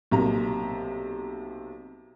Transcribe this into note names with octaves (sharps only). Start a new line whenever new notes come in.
B1 C3 A#3 A#5